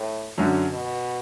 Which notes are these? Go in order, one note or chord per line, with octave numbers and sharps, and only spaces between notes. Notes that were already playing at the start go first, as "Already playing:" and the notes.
Already playing: A2
F#2 D3 F#3 C#4
B2